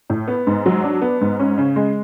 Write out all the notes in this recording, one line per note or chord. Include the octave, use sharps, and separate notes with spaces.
A2
B3
G#2
F#3
D4
B3
G#2
C#4
C#3
G#3